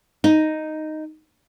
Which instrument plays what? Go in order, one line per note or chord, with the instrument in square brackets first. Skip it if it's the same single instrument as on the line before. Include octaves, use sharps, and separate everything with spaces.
[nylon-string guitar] D#4